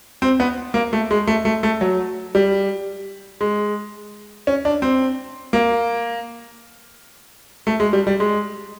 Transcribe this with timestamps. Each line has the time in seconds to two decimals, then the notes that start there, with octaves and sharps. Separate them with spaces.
0.22 C4
0.40 B3
0.74 A#3
0.93 A3
1.11 G#3
1.27 A3
1.45 A3
1.63 A3
1.81 F#3
2.35 G3
3.41 G#3
4.47 C#4
4.65 D4
4.82 C4
5.53 A#3
7.67 A3
7.80 G#3
7.93 G3
8.07 G3
8.20 G#3